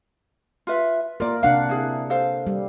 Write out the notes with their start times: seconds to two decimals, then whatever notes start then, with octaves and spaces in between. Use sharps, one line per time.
0.67 F4 B4 E5
1.20 A#3 F4 A#4 D5
1.43 C3 D4 F5 F#5
1.69 E4 G#4
2.10 A4 C5 F5
2.47 G3